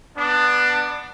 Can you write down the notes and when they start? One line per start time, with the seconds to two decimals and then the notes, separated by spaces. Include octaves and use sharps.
0.16 B3 D4